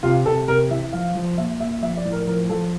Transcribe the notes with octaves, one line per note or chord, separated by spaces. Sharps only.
C3 F4
C3 A4
C3 A#4
E3 E5
F3 F5
F3
A#2 E5
A#2 E5
F3 E5
D5
A2
A#4
F3 A#4
F3 A4